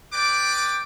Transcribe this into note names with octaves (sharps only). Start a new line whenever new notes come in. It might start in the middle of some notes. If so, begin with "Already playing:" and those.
B4 D5 G5 D6